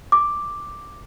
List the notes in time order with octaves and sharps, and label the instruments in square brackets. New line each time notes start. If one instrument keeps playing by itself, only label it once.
[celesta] D6